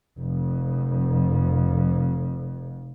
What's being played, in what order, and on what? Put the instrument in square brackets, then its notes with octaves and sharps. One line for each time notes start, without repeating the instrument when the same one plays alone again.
[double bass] F1 F2